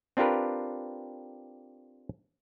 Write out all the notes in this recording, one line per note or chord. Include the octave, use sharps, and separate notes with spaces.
C4 D4 F4 G4 A#4 B4